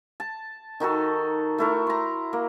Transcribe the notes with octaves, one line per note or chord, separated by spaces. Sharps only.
A5
D#3 D#4 F#4 A4
A3 E4 A#4
A#5 C6
A#3